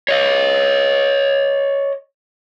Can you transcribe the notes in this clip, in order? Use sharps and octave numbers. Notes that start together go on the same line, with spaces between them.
C#5 D#5